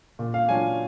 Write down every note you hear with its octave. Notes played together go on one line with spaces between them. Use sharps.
A#2
F5
F#3 D4 F4 G#5